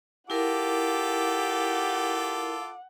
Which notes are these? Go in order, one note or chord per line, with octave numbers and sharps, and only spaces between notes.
E4 F4 G4 A4 A#4 F#5 D6